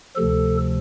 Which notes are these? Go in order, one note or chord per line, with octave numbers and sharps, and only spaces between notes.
D2 C3 F3 A4